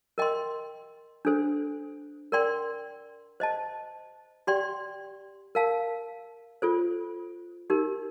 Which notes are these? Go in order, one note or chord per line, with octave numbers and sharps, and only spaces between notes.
A#4 D#5 G5 C6
D4 A4 C5
A#4 D5 G5 C6
C5 D#5 A5
G4 D5 G5 C6
A#4 F5 A5
F4 A4 C5
D#4 G4 A#4